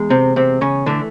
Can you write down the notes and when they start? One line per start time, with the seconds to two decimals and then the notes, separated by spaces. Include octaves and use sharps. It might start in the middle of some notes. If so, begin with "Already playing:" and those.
Already playing: E2 G#3
0.10 C3 C4
0.36 C3 C4
0.61 C#3 C#4
0.86 D3 E3 A3 D4